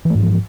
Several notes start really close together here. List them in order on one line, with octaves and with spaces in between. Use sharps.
E3 A3 G#2 F3